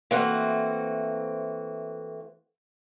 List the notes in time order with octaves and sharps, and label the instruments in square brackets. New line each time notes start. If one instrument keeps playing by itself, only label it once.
[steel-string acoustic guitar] E3 A3 A#3 C4 F#4